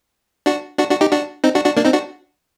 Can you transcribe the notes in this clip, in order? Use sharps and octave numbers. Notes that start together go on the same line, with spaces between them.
D4 F#4
D4 F#4
D4 F#4
D#4 G4
D4 F#4
C4 D#4
D4 F#4
D4 F#4
A#3 D4
C4 D#4
D4 F#4